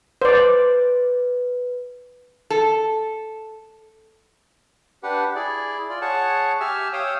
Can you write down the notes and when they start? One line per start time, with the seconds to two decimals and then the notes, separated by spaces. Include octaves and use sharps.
0.22 B4 C5 D5
2.50 A4
5.03 D4 G4 B4 F#5
5.35 E4 G#4 D5
5.89 F4 D5
6.02 G#4 C#5 F#5 A5 C#6
6.61 G4 E5 G#5 E6 F6
6.93 C#5 F5 G5 D#6 E6